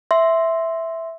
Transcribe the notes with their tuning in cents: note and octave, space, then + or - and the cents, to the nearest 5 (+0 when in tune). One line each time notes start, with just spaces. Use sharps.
E5 +0 C6 +0